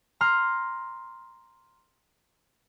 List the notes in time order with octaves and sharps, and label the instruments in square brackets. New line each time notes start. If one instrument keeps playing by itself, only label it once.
[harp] A#5 C6 F6